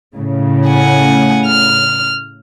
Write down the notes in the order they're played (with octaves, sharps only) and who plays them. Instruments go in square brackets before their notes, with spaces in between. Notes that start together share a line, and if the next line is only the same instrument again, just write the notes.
[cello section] A2 C#3
[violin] F#5 G#5
F6